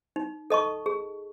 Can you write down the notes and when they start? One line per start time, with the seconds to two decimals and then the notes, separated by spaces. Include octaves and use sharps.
0.16 D#4
0.50 A4 D#5 A5 C#6
0.86 G#4